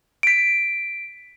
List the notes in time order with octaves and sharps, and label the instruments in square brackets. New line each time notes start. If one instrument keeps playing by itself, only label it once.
[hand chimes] B6 D7